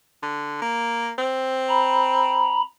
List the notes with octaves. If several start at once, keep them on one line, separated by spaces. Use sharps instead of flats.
D3
A#3
C4
A#5 B5